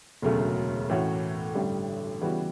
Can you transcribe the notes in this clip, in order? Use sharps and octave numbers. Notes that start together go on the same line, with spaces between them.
E1 D2 C#3 F#3 A3
A2 E3 A3 C#4 F#4
A1 G2 D3 G3
C#3 E3 G3 B3 F#4